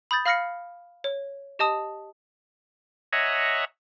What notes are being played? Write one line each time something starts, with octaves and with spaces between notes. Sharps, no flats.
B5 D#6 G6 A6
F5 B5 F6 A#6 C7 C#7
C#5
G4 D#5 A5 D#6
C#5 D#5 E5 F#5 G#5 A#5